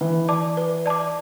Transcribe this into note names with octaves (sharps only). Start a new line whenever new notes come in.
E3 B4
D5 A5 D6
B4
D5 A5 D6